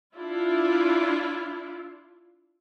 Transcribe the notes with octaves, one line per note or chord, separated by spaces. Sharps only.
D4 E4 F4